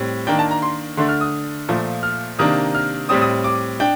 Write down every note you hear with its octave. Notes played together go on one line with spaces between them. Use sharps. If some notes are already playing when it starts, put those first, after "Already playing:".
Already playing: A2 G3 C4
D#3 A#3 D4 G5
A5
A#5
C6
D3 A3 D4 C6
F6
D#6
A#2 F3 A3
F6
C3 D#3 A#3 D4 D#6
F6
A2 G3 C4 D#6
D#6
D6
D4 G5